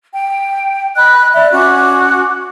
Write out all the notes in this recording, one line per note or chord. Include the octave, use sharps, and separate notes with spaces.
G5
D#5 B5 F#6
D5 E5
C#4 F#4 D6